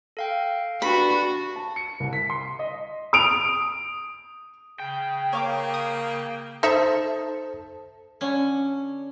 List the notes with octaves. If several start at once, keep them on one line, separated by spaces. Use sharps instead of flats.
A4 F5 G5
G2 D4 F#4 B5
A5
C#7
C2
B6
C6
D#5
D#6 D7 F7
C#3 G5
A#3 C#5 F5 D6
D#6
D#4 A4 C5 E5 A5
D3 C#4